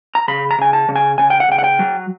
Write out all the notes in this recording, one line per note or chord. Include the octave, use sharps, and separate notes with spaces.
A#5
C#3 B5
A#5
C#3 G#5
A5
C#3
G#5
C#3 G#5
G5
F#5
C#3 G5
F#5
G5
F#3